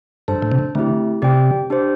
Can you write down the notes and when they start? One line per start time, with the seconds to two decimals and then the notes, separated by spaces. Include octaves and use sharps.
0.28 G2 D4 A4 C5 A5
0.42 A2
0.52 C3
0.75 D3 A3 C4 E4 G4
1.22 C3 G4 D5 G5
1.70 D4 G4 C5